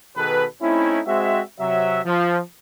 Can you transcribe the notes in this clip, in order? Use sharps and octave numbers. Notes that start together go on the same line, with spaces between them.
B2 D#3 G#4 A4 B4
A3 C4 C#4 D#4 E4
G#3 C4 F#4 E5
C3 F#3 E5
F3